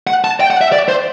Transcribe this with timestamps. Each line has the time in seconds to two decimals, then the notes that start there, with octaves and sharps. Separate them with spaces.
0.07 F#5
0.24 A5
0.40 G5
0.50 F#5
0.61 E5
0.72 D5
0.89 C5